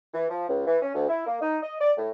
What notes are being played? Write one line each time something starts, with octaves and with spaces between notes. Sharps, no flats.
E3
F3
C#2
E3
C#4
D2
E4
A#3
D#4
D#5
D5
A2